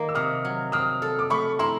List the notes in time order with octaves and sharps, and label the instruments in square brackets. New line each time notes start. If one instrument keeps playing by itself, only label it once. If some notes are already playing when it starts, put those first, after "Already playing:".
Already playing: [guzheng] D#3 A#3
[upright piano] E6
[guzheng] C3 [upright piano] D#6 F6
[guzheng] F#3
[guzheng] C4 [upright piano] D#6 F6
[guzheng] A4
[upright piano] D6
[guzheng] A3 [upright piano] B5 C#6
[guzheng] E4 [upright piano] A#5 C6